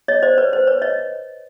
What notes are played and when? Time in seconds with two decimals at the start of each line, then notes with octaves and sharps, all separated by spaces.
0.08 C#5 D#5
0.22 C5 D5
0.38 B4 C#5
0.53 C5
0.67 B4 C#5
0.82 C#5 D#5